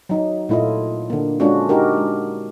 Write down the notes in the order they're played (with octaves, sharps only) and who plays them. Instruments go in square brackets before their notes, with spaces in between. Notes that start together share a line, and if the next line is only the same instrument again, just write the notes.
[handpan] F#3 D#4
A#2 A3 E4 F4 D#5
D3 A#3
G#3 C#4 D4 F4 F#4
D#4 F#4 G4 A#4
G#3